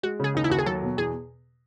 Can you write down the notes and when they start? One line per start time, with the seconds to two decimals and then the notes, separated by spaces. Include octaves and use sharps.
0.03 G#3 F#4
0.20 C#3 G#4
0.35 D#2 D#4
0.44 E4
0.50 D#2 F#4
0.59 G#4
0.66 F#3 A4
0.82 B2
0.97 E2 G#4